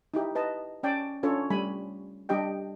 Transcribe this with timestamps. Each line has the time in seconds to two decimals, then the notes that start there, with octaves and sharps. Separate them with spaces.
0.14 D#4 E4 G4
0.35 B4 D#5 A5
0.83 C#4 D5 G5 A5
1.23 C#4 D4 F4 A4 C#5
1.50 G3 A3 G#5 B5
2.29 G3 D4 G4 D#5 G5